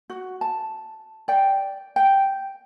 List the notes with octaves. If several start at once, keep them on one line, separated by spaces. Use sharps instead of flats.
F#4
A5
D5 G5
G5